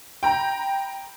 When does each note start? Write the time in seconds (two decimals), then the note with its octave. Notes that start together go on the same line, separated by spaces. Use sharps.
0.23 G5 A#5 B5